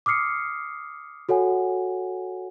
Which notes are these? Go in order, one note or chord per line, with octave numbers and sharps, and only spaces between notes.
D6 D#6 F6 C7 C#7
F#4 A4 C#5 F#5 G#5